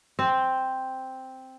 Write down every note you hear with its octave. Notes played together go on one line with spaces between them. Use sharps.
C4